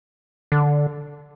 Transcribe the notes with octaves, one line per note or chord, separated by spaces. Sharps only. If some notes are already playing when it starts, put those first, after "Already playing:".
D3